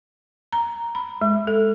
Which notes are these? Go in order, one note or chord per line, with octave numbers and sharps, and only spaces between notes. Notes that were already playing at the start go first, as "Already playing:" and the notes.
A#5
B5
G#3
A4